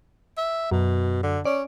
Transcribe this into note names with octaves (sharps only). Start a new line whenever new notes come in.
E5
F#2 B2
D3
C#4 D5